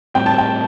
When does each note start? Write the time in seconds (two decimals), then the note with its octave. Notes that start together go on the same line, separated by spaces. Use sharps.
0.15 A2 G3 C4 G5
0.26 A5
0.38 G5